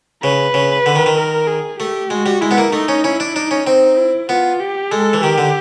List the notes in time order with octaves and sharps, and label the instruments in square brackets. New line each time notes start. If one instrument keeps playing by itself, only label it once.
[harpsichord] C#3 [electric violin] B4
[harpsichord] C#3
D3
D#3
D#3
[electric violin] A#4
G#4
[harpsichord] A3 [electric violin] G4
[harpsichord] G#3 [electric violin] F#4
[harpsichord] G3
[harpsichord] G#3 [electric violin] E4
[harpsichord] B3
A#3
[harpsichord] A3 [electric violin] D#4
[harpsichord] C#4
[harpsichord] C#4 [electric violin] E4
[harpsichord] D4
[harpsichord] D4 [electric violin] D#4
[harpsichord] C#4
[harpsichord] C4 [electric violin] D#4
[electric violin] E4
[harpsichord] B3 [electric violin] F4
[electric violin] G4
[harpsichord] G#3 [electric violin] A4
[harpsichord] E3
[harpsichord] D#3 [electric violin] G4
[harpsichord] D3